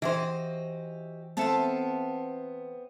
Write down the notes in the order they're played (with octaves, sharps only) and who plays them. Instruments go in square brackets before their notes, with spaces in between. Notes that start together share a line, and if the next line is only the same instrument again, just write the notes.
[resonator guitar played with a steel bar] E3 C5 [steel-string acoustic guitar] F#4 G4 D#5
[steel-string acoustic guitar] B3 C4 E5 [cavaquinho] F4 A4 A5